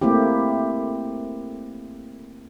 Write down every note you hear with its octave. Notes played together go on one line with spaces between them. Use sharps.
A3 A#3 C4 E4 G4